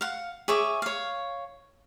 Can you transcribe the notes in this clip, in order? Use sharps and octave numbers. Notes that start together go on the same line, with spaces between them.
F5 F#5
G#4 C#5 E5 D6
C#5 F5